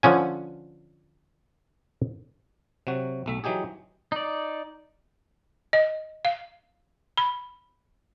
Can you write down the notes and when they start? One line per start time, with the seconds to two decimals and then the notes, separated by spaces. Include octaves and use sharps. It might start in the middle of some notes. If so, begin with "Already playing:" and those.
0.03 D3 F3 C#4 G#5
2.87 C3 F#3 F#4
3.26 B1 A3 E5
3.44 E3 F#3 D#4 G4 G#4
4.12 D#4 D5
5.73 D#5
6.25 F5
7.17 B5